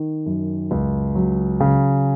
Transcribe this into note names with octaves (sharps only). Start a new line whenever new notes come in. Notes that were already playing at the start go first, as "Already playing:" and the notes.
Already playing: D#3
F#2
C#2
F#3
C#3